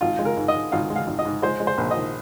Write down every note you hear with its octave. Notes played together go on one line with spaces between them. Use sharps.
G#1 F4
G#3
A#4
G#2
D#5
G#2
G#1 F5
G#3
F5
G#1
D#5
G#2
G#3 C5
G#3
C5
A#1
D#5
D#3